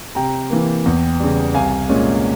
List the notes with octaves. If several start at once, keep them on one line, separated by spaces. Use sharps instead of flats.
C3 G5 A#5
E3 A#3
E2
C#3 G3
C2 F5 G#5
A#2 G#3 C#4